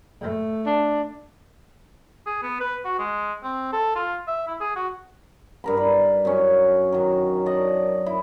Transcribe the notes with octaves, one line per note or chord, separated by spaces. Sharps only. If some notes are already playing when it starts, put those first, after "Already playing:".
A3
D4
G#4
B3
B4
F#4
G#3
C4
A4
F4
E5
E4
G#4
F#4
G2 A#4 B5
B4
F#2 C#4
D#3 F#3
A4 D5 D#5
E4